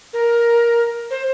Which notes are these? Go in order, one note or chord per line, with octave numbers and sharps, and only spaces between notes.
A#4
C5